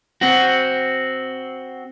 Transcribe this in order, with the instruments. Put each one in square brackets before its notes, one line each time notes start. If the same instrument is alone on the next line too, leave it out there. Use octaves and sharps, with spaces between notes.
[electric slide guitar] C4 F#4